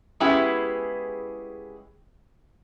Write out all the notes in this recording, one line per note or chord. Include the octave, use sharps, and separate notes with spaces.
G#3 B3 C#4 E4 G4 G#4